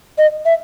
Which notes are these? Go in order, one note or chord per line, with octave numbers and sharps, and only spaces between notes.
D#5
E5